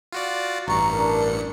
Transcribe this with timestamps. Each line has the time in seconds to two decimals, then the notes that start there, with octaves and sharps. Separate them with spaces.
0.12 F4 F#4 D5
0.67 A1 G2 A#5 C#6 C#7
0.92 D4 A#4